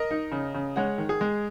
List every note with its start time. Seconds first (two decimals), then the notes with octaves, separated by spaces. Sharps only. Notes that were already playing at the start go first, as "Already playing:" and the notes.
Already playing: A#4 D#5
0.11 D#4
0.32 C#3
0.55 C#3
0.76 G#3 C#5 F#5
0.98 D#3
1.09 G#4
1.21 G#3